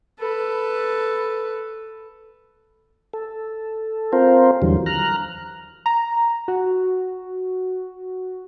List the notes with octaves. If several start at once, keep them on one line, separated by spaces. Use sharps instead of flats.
A4 B4
A4
C4 F4 A#4 C5
E2 D3 E3 F#3 G3
A#5 F6 F#6
A#5
F#4